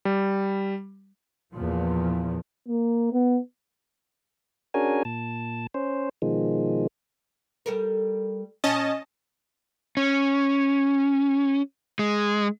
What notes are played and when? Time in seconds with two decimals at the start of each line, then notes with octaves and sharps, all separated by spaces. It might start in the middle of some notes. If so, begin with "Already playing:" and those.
0.05 G3
1.54 E2 A#2 F3
2.68 A#3
3.13 B3
4.74 C#4 D4 F#4 G#4 A#4 G#5
5.05 A#2 A5
5.74 C#4 C5
6.22 B2 D#3 F3 G#3
7.66 G3 A4 A#4
8.64 A#2 C#4 D#5 A5
9.97 C#4
11.99 G#3